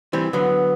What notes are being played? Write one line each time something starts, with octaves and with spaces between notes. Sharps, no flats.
E3 G3 C4
D3 F#3 B3